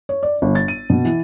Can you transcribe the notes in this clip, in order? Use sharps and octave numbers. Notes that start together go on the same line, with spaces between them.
C#5
D5
G1
A6
D#7
B2
E3